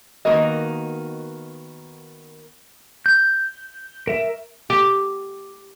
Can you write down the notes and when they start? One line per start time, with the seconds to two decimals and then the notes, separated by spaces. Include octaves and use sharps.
0.25 D#3 A#3 B3 F#4 A#4 D#5
3.06 G6
4.07 A#4 E5
4.70 G4